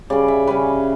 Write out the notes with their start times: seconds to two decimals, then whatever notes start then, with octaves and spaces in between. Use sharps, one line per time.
0.10 C#3 G3 C#4 D5
0.28 E5
0.47 C#3 G3 C#4 B4